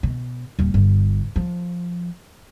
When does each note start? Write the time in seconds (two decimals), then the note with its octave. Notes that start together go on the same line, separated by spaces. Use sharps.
0.03 B2
0.59 D#1 C#4
0.74 G1
1.36 F3